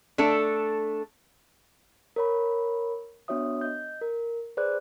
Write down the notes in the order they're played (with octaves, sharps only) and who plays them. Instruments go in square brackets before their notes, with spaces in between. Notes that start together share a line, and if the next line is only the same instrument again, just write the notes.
[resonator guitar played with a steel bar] A3 D4 A4
[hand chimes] A#4 C#5 B5
B3 D4 F#4 C#5 E5 D#6
D#5 G6
A#4
G#4 B4 C5 D5 F#6